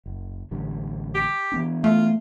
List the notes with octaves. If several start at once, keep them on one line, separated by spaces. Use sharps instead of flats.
F#1
A1 D3 G3
G4
E3 B3 D4
A3 F4